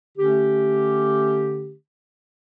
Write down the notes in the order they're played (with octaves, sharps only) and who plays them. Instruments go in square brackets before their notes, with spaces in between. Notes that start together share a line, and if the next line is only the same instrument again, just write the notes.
[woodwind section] D3 A3 C#4 G4